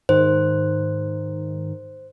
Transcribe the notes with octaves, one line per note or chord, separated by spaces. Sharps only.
G#2 D#3 D#4 C5